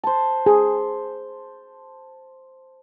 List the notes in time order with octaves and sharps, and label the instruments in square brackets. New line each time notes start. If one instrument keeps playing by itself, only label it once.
[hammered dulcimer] C5 A5
[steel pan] G#4